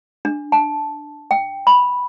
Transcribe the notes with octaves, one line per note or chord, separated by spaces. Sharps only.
D4
A5
G5
B5